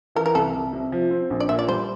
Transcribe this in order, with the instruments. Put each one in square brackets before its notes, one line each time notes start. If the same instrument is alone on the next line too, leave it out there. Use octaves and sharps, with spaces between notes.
[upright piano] E3 [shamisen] A#4
[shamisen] A#4
[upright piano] C2 [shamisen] A4
[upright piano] C2
C3
F3
C4
A#1
[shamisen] D5
[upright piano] A#2 [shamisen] E5
[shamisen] D5
[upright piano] G3 [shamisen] C5